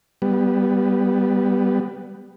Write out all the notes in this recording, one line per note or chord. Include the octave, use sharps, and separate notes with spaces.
G3 B3